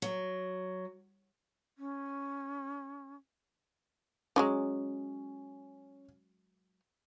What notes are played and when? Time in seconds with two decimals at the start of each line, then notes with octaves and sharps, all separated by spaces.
0.02 F#3
1.76 C#4
4.36 F3 F#3 G#3 C#4